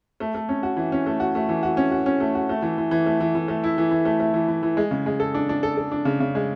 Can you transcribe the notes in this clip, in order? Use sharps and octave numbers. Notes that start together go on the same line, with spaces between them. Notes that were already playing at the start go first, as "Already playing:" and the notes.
A3
A3
C#4
F#4
E3
C#4
A3
F#4
A3
E3
F#4
C#4
F#4
C#4
A3
F#4
A3
E3
E3
E3
A3
E3
E3
A3
E4
E3
E3
A3
A3
E3
E3
E3
G#3
C#3
G#3
A4
D4
D4
A4
A4
D4
C#3
C#3
G#3